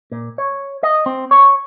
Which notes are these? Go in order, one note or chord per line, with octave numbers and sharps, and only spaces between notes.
A#2
C#5
D#5
C4
C#5